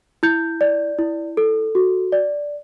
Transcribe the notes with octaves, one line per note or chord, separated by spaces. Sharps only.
E4 G6
D5
E4
A4
F#4
D5